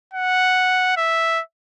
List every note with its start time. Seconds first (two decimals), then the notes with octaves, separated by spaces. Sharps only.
0.14 F#5
0.97 E5